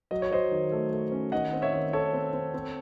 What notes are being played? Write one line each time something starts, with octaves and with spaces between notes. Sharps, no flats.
F#3 D#5
C#5
F#3 C5 D#5
D#3
A3
A3
C#4
D#3 D#5 F#5
C4
C#5 E5
D#3
D#3 A4 C#5
C4
C4
C4